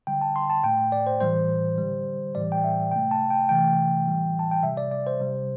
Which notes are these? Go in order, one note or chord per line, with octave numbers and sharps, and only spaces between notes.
D3 G3 G5
A5
C6
A5
A2 A3 G5
D5
C5
A2 E3 G3 C5
D3 G3
A2 E3 G3 D5
G5
E5
C3 A3 G5
A5
G5
C3 E3 A3 G5
A2 E3 G3
A5
G5
C3 G3 E5
D5
D5
C5
C3 G3